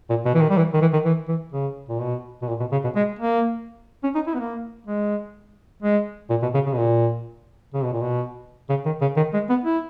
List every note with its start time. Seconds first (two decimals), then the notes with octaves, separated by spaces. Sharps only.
0.10 A#2
0.25 B2
0.35 E3
0.41 D#3
0.50 G3
0.57 E3
0.73 D#3
0.81 E3
0.93 D#3
1.05 E3
1.28 E3
1.52 C#3
1.89 A#2
2.01 B2
2.42 B2
2.48 A#2
2.60 B2
2.72 C#3
2.84 B2
2.96 G#3
3.19 A#3
4.03 C#4
4.15 D#4
4.27 E4
4.34 B3
4.40 A#3
4.87 G#3
5.83 G#3
6.30 A#2
6.43 B2
6.54 C#3
6.66 C#3
6.73 B2
6.78 A#2
7.74 C#3
7.84 B2
7.93 A#2
8.02 B2
8.70 C#3
8.86 D#3
9.01 C#3
9.17 D#3
9.34 G#3
9.50 B3
9.64 E4